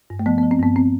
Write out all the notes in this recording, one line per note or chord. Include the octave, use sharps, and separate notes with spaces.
G2
A3
F3 B3
B3
F3
C4
G2 B3
C4